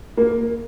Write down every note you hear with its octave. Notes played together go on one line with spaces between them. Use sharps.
A#3